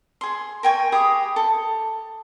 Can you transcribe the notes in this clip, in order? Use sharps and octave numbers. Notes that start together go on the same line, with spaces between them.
G#4 C6
A#4 G5 G#5 C#6
G4 G#4 B5 D#6
A4